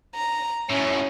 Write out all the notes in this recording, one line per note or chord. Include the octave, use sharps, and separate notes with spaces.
A#5
F#2 A2 C#4